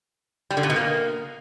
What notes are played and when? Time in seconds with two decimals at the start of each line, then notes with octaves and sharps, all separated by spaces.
0.51 G3
0.57 D3
0.63 A#2
0.70 B2
0.76 A#3